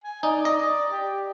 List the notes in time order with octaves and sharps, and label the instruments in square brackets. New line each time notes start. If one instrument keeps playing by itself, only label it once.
[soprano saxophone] G#5
[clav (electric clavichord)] D#4 [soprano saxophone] D5
[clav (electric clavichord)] D#5
[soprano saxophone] G4